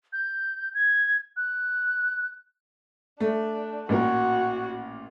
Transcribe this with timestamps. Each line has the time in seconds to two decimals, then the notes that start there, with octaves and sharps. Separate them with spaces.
0.13 G6
0.74 G#6
1.37 F#6
3.20 A3 D4
3.89 A1 A#2 F#4 A#4